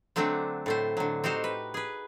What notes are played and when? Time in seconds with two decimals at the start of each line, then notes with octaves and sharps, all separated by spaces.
0.16 D3 F#3 A3 C4 D4
0.66 A2 A3 C5
0.97 D3 F#3
1.24 C4 D#4 F#4 G4 C5
1.44 B4
1.74 G#4 B4